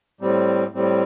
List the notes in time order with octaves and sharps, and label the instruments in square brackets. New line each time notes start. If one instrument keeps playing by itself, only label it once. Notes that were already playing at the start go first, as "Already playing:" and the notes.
[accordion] A2 G3 C4
A2 G3 C4